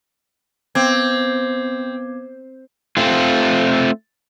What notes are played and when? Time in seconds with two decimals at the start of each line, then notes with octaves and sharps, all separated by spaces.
0.75 B3 C4 D6 G#6
2.97 A3 C4 F4